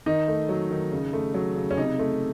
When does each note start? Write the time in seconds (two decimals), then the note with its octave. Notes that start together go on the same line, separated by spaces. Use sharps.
0.06 D#3 D#4
0.28 A3
0.49 F#3
0.71 D#3
0.92 C#3
1.13 A3
1.34 F#3
1.56 C#3
1.71 C#4
1.77 C3 D#4
1.99 A3